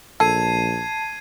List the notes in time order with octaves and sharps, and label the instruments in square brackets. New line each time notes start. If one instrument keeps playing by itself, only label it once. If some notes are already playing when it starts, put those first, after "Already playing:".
[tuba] A#1 [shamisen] A4 [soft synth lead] A5 [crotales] G#6 C7 D#7